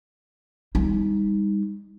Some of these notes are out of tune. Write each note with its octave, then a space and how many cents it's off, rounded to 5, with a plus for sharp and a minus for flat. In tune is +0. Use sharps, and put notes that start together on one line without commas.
G3 +30 D#4 +15